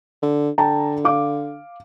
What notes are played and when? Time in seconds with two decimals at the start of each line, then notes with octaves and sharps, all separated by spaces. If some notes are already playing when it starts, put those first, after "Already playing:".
0.22 D3
0.58 D3 G5 A5 A#5
1.05 F5 D6